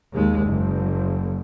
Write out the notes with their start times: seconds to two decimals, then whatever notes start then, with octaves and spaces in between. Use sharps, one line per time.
0.13 D#2 G#3
0.44 F#1